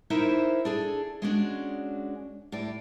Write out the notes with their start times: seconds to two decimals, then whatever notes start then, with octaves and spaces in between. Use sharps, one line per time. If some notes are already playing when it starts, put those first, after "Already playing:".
0.10 D#4 E4 A#4 C5 E5
0.65 D4 G#4 A4
1.22 G#3 C#4 D4 F#4
2.52 A2 D5